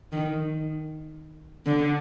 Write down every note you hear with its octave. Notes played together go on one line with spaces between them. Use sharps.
D#3
D3